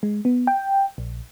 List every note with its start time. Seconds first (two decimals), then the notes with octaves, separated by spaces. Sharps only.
0.03 G#3
0.25 B3
0.47 G5
0.98 A#1